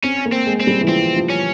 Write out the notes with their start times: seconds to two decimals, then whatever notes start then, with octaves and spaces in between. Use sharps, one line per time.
0.04 C4 C#4
0.26 A#3
0.32 C4
0.46 G#3
0.61 C4
0.67 G3
0.81 E3
0.88 F3 C4
1.16 F3
1.30 C#4